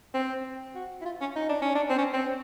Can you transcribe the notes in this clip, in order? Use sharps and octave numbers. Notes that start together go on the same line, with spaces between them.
C4
F#4
E4
F4
C#4
D#4
D4
C#4
D4
C4
C#4
C4